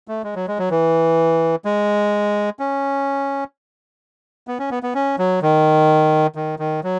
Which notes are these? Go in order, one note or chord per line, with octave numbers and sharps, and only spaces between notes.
A3
G#3
F#3
G#3
F#3
E3
G#3
C#4
B3
C#4
B3
B3
C#4
F#3
D#3
D#3
D#3
F#3